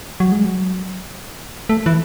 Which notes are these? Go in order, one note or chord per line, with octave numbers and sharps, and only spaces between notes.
F#3
G#3
F#3
A3
E3